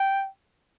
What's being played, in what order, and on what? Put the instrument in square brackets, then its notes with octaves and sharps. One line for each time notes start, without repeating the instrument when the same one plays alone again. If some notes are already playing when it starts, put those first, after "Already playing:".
Already playing: [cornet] G5